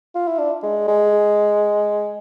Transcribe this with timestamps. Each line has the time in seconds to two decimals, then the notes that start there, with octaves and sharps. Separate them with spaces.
0.15 F4
0.28 E4
0.39 D4
0.63 G#3
0.88 G#3